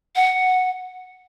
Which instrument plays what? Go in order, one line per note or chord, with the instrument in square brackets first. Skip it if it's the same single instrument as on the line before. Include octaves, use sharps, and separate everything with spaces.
[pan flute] F#5